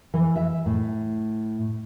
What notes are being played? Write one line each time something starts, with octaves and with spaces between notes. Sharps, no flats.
E3
E5
A2